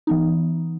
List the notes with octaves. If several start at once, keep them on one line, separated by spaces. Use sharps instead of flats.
E3 B3 D#4